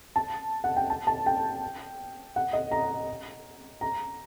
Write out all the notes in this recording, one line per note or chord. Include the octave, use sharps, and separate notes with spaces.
A5
F#5
G5
A5
A5
G5
F#5
D#5
A#5
A#5